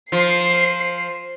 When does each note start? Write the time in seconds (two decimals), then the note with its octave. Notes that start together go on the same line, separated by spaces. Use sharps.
0.12 F3 C7